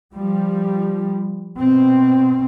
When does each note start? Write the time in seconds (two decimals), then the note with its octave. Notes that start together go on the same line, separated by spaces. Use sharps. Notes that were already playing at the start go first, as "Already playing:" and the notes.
0.14 F3 G3
1.58 B2 C4